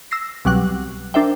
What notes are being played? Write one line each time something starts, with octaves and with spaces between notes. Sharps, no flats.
E6 A#6 C7
C2 B2 F#3 G3 F#5 F#6
D4 A#4 C5 E5 G5